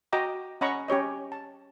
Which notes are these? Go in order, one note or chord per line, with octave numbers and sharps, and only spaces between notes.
F#4 D#5 G5 A#5 D6
C#4 D#5 F#5 A#5 B5 C#6
C#4 G4 C#5 D#5
A5